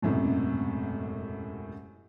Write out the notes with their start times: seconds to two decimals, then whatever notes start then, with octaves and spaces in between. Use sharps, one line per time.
0.02 E1 A1 F#2 A2 C3